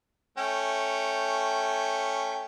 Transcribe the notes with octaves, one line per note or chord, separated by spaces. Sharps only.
A3 C#4 G5